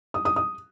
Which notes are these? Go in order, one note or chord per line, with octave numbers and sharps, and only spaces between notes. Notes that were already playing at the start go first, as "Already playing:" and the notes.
D#6
D#6
D#6